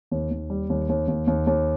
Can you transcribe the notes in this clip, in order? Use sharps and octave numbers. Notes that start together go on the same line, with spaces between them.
D#2
D#2
G3
D#2
D#2
D#2
D#2
D#2